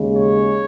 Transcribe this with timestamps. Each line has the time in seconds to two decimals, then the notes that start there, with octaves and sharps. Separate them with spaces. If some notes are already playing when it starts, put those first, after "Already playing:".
Already playing: D#2 C#3 G#3
0.15 C#5